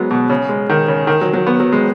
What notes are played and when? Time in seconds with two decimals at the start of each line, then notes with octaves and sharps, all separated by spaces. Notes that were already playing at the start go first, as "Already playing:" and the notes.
Already playing: F#3 G#3 B3
0.11 B2
0.30 C#3
0.49 G#3
0.70 D#3
0.88 C#3
1.07 D#3
1.21 F#3
1.33 F#3
1.47 B3
1.60 F#3
1.72 G#3